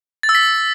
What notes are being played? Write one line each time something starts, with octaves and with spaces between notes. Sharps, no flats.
A6
E6
B6